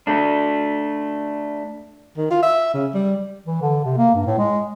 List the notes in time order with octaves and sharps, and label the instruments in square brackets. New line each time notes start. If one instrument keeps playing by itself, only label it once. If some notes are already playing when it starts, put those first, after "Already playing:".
[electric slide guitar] A3 D4
[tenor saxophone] D#3
F4
E5
C#3
G3
[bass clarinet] E3
D3
C3
A#3
G2
A2
G#3